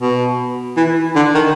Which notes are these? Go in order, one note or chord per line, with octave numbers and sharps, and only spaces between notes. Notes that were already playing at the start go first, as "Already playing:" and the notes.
B2
E3
D3
D#3